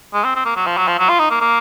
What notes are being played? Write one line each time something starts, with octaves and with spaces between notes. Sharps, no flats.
G#3
C4
C4
A#3
F#3
F3
F#3
F3
F#3
F4
D#4
A#3
A#3